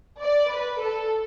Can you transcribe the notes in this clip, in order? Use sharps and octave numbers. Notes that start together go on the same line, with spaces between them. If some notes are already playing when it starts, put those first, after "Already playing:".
D5
B4
A4